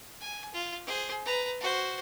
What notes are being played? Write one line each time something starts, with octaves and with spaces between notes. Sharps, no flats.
G#5
F4
G#4 C5
B4 A#5
F#4 C5